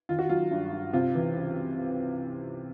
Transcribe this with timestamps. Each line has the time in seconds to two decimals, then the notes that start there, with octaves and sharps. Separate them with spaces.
0.09 D#3 F4
0.19 F#4
0.29 F#3 F4
0.51 G2
0.72 G2
0.93 C3 F4
1.15 E3
1.35 C#2